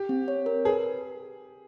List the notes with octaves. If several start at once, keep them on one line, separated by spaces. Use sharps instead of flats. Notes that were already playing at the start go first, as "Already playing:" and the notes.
Already playing: G4
C4
C#5
A#4
G#4 B4